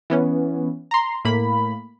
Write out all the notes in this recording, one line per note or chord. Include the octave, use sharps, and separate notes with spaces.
E3 B3 C#4
A#5 C6
A2 A#3 B5